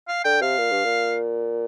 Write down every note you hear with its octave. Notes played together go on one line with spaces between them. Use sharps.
F5
D3 G5
C3 F5
A#2
G2
A#2